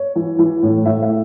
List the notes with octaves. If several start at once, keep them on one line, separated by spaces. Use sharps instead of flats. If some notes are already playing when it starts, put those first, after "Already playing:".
Already playing: C#5
E3
E3
A2
A2 E5
E5